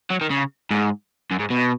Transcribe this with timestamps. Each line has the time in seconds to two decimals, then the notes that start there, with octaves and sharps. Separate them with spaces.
0.10 F#3
0.21 D#3
0.30 C#3
0.71 G#2
1.31 F#2
1.39 G#2
1.50 B2